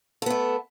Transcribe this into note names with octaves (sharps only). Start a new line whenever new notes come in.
A3 B3 A4